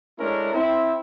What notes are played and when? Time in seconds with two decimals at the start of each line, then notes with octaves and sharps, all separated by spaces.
0.18 G#3 A3 C#4 D4 E4 A#4
0.53 C4 E4